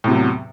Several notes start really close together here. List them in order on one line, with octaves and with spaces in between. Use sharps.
A2 C3 F#3 E2